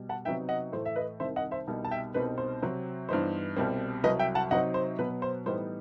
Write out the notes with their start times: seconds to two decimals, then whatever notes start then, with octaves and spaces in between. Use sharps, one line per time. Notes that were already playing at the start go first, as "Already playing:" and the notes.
Already playing: B2 G3
0.09 F#5 A5
0.25 C3 F#3 B3 D#4 E5 G5
0.49 D#5 F#5
0.72 A2 E3 A3 C5
0.86 E5
0.96 B4 D#5
1.20 C2 C3 D#3 C5 E5
1.36 D#5 F#5
1.51 C5 E5
1.67 C2 B2 G3 D#4
1.85 A5
1.91 E5 G5
2.14 C2 B2 G3 C4 D#4 B4
2.38 C5
2.62 C3 F#3 C4
3.09 G2 E3 B3 D#4 C5
3.56 C2 B2 G3 C4
4.04 C2 C3 F#3 B4 D#5
4.19 E5 G5
4.35 F#5 A5
4.51 C3 F#3 C4 D#4 D#5 F#5
4.74 C5
4.99 B2 F#3 B3 B4
5.22 C5
5.46 A2 E3 G3 B3 D#4 C5